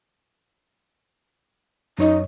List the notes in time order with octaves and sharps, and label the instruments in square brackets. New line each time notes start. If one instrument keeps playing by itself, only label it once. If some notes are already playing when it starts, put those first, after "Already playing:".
[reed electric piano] F#2 C#5 D#5 [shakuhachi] D#4